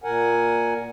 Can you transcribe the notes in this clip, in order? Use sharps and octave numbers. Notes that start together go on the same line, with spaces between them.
A#2 A#4 F#5 G#5